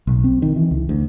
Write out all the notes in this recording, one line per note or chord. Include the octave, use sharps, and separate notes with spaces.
B1
C4
D#3
E3
C#2
D2